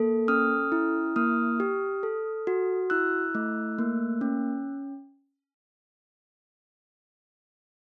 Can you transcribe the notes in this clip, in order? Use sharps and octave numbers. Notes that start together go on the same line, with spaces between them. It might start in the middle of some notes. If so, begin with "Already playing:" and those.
Already playing: A#3 A4
C#4 D#6 F6
E4
A#3 D#6 F6
G4
A4
F#4
E4 E6 F#6
A3
A#3
C#4